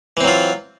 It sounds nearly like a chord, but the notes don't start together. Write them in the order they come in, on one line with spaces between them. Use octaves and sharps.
E3 C4 F#3 F4